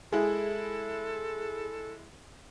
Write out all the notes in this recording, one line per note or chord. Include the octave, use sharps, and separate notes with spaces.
G#3 E4 G#4 A4